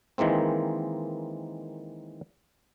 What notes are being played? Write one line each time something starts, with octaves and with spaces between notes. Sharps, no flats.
D#3 E3 G#3 A#3 C4